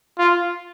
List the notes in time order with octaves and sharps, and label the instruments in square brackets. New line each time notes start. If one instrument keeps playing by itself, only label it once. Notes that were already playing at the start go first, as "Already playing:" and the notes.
[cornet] F4